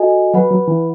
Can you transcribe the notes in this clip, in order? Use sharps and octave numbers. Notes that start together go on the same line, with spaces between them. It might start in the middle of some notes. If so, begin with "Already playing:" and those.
Already playing: F#4 A4 D#5 G#5
F#3 B4 F#5 B5
F#3
E3